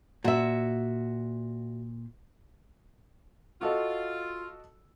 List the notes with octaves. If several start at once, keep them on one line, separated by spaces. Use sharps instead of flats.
A#2 F#4 E5
F4 F#4 A4 D#5